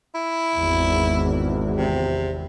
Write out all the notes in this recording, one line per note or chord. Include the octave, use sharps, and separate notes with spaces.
E4
G#1 E2
C3